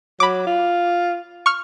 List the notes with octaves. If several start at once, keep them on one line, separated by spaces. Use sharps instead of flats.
F#3 B5 D6
F4
C#6 F6